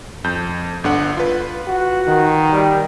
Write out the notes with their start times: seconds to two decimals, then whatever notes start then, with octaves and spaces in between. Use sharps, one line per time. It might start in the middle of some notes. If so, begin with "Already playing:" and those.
0.24 F2 G6
0.84 G1 D3 F#5
1.17 F4 B4
1.68 F#4
2.07 D#3
2.52 G3